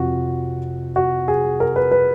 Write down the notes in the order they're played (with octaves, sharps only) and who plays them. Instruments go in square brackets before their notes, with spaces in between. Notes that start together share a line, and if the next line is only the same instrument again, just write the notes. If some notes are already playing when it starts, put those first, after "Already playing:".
Already playing: [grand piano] F2 C3 F3 F#4
F#4
G#4
A#4
B4
B4